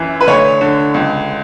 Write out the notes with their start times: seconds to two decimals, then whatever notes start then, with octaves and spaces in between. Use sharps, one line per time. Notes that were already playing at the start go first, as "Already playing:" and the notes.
Already playing: F#2 E3
0.21 B4
0.27 D2 C#5
0.61 D3
0.94 C#2